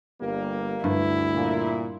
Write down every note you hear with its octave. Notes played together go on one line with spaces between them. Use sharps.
G1 G3 A#3
D2 G2 E4
A#2